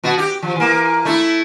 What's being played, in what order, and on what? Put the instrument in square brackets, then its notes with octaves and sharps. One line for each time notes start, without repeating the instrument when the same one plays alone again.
[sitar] B2 F#4
G4
F3
E3 A#3
A3 E4